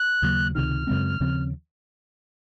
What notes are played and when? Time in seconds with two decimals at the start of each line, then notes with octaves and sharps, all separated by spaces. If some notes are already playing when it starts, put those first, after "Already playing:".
Already playing: F#6
0.22 D#2 C#3 F#3 A#3
0.54 C#2 C3 D#3 F6
0.87 F#2 C#3 G#3 C4
1.20 D#2 C#3 F3 C4